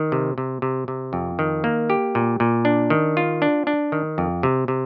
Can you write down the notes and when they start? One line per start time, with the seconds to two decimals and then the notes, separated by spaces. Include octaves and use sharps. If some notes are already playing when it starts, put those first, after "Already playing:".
Already playing: D#3
0.12 C3
0.38 C3
0.62 C3
0.88 C3
1.13 F2
1.39 D#3
1.64 A#3
1.90 G4
2.15 A#2
2.40 A#2
2.65 D4
2.90 D#3
3.17 F4
3.42 D4
3.67 D4
3.92 D#3
4.18 F2
4.43 C3
4.68 C3